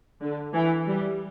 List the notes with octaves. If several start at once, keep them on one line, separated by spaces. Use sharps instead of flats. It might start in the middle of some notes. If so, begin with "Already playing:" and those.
D3
E3
G3